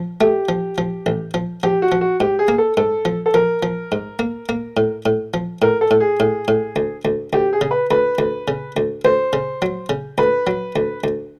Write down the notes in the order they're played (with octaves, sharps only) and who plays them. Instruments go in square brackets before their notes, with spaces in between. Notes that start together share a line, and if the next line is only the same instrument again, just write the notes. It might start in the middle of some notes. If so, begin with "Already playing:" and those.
Already playing: [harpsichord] F3
[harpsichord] A3 [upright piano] G4
[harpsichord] F3
F3
A1
F3
[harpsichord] F3 [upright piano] G4
[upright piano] F#4
[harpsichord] F3
[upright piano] F#4
[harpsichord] G#2 [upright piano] G4
[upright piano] G#4
[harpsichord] A#3
[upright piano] A4
[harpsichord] G#2 [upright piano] A4
[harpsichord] F3
[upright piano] A4
[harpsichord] F3 [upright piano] A#4
[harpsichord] F3
G#2
A#3
A#3
A2
A2
F3
[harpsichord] A2 [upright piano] A#4
[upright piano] A4
[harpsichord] A2
[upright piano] G#4
[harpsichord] A2
A2
D2
D2
[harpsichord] D2 [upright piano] G4
[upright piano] G#4
[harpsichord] C#3
[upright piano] B4
[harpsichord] D2 [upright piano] B4
[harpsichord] D2
C#3
D2
[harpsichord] D2 [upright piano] C5
[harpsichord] C#3
F#3
C#3
[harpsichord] D2 [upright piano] B4
[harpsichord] F#3
D2
D2